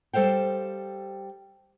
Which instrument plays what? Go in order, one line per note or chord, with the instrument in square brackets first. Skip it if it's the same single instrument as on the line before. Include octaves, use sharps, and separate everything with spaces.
[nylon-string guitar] G3 A4 C5 F5 G5